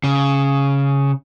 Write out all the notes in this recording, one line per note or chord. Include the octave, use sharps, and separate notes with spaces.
C#3